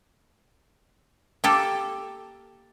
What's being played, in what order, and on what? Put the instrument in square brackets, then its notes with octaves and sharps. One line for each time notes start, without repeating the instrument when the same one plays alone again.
[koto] A#3 G4 A4